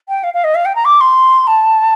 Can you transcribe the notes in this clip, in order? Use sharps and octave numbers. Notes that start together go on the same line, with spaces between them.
G5
F5
F5
D#5
F5
G5
A#5
D6
C6
A5